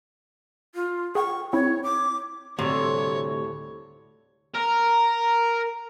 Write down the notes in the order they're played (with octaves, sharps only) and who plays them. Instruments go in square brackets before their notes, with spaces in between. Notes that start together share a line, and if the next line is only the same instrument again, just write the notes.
[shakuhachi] F4
[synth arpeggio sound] G#4 F#5 G5 [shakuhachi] C#6
[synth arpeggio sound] C4 E4 [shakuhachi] C#5
[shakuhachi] D6
[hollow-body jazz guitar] D2 [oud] A2 G3 [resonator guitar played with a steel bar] C3 [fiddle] C#5
[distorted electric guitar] A#4